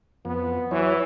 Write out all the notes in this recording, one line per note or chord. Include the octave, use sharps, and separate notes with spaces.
F2 B3
E3 F#3 E4 C#5